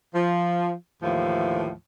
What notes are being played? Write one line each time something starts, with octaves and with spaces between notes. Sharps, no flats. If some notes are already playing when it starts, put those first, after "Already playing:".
F3
D#2 A2 E3 F3